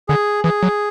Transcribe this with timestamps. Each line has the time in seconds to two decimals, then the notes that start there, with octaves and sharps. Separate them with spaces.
0.09 D3 G#4
0.44 E3 G#4
0.63 F#3